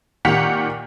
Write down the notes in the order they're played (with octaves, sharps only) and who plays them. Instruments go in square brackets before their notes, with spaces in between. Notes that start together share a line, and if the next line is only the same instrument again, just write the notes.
[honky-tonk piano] A#2 D#3 G4 F#5 B6 F7